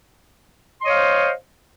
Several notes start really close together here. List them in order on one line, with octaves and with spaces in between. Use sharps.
C6 D#5 C#5 F5 C5